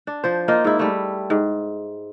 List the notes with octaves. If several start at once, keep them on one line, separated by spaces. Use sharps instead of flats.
D4
F3 C5
A#3 D#4 F4 D#5
G#2 E4
G3 A3
G#2